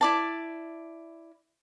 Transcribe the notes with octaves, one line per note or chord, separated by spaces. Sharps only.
E4 D5 A5